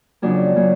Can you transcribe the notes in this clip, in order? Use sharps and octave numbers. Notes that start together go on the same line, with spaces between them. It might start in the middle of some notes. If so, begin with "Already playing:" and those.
F2 C#3 F#3 A#3 D4
C#3 F#3 A#3